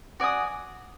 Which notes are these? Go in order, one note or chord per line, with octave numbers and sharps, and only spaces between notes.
F#4 D5 G#5 D#6